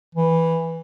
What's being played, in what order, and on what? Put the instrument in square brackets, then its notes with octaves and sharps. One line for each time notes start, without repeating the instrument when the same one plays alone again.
[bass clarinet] E3